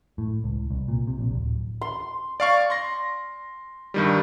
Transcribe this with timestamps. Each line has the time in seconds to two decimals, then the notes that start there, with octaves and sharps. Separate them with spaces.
0.18 A2
0.44 C#2
0.70 C2
0.88 A#2
1.07 C3
1.19 A#1
1.35 D1
1.81 C6
2.40 D5 F5 C#6
2.70 C6 A#6
3.94 G2 D#3 G3